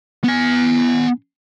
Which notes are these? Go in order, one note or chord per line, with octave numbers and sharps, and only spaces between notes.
B3 G#5